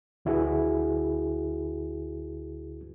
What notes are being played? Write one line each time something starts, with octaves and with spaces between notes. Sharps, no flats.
D2 D3 E4 F#4 G#4 B4